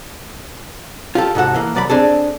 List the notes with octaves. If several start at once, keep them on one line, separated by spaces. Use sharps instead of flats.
F4 G4 A4
G#2 C3 F#4 A4 F#5
E3 A#3
C2 F#3 D5 D#5 B5
C4 D4 G#4 A4